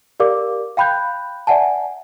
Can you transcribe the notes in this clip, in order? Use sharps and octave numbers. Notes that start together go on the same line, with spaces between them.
G4 A#4 D5 F5 D6
F5 G5 B5 F#6 G6
D5 E5 F#5 G#5 A5